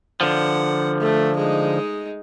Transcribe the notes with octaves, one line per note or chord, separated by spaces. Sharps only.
D3 F3 F#5
A3
G#3 D#4